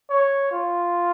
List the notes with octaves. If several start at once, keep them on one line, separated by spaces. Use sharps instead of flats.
C#5
F4